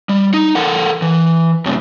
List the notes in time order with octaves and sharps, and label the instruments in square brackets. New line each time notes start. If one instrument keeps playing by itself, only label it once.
[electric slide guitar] G3
D#4
A4 A#4 F#5
E3
F#2 A2 C3